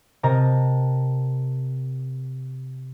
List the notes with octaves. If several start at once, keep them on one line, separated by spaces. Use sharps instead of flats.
C3 A#4 D#5 A5 A#5